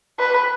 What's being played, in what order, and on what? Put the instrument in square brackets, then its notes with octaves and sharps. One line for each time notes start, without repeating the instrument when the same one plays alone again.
[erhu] B4